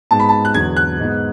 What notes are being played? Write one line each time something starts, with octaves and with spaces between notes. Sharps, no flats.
G#2 G#3 B3 A5
B5
A5
F#6
E2 D3 F#3 G#6
F#6
G#2 G#3 B3